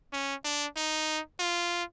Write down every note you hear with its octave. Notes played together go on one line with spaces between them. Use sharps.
C#4
D4
D#4
F4